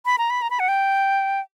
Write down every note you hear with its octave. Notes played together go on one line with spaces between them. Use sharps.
B5
A#5
B5
A#5
B5
F#5
G5